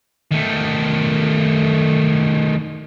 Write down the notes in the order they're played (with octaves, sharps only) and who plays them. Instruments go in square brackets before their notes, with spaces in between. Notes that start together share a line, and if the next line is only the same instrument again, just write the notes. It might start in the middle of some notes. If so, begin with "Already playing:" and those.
[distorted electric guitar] D#3 A3